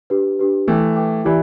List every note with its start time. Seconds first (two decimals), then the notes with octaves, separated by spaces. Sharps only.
0.10 D4 G4 B4
0.39 D4 G4 B4
0.68 E3 A3 B4 G5 D6
0.96 B4 G5 D6
1.25 E3 E4 G4 D5 B5